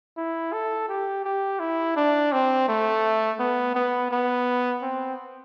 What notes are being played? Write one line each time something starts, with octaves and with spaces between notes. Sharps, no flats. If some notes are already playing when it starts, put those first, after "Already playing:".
E4
A4
G4
G4
E4
D4
C4
A3
B3
B3
B3
C4